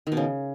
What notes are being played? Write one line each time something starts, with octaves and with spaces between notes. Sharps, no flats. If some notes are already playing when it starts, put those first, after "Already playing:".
D#3
B2
C#3